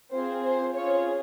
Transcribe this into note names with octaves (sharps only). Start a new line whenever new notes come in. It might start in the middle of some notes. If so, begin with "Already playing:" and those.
C4 F4 G#4 C5
C5
C#4 F4 G#4 C#5